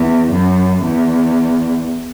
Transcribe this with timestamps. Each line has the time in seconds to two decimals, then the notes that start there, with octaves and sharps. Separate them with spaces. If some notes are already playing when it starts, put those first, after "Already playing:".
Already playing: E2
0.31 F#2
0.82 E2